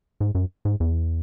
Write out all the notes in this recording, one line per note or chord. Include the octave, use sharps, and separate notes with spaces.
G#2
F#2
G#2
E2